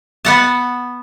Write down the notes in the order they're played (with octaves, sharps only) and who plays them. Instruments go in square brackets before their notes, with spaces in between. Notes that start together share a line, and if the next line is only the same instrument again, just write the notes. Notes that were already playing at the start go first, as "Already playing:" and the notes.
[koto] B3 F#5 A5